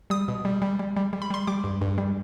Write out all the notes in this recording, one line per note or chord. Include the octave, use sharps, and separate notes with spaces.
G3 D#6
B2
G3
G3
G3
G3
G3
B5
G3 C6
G3 D6
G2
G2
G3